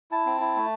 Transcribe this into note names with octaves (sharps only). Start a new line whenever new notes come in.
E4 A5
C4
E4
A3